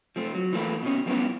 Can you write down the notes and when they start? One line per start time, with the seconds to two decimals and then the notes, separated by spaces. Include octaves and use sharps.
0.16 F3 A3 C4
0.35 F#3
0.53 E3 F3 A3 A#3 E4
0.83 B2 C#4
1.06 F3 G3 A#3 B3 C#4 E4